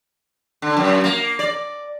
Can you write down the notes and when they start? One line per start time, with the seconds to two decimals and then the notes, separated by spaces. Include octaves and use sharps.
0.62 D3
0.77 F#2
1.04 A#3
1.39 D5